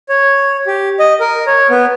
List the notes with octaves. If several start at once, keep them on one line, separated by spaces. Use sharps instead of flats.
C#5
G4
D#5
A#4
C#5
B3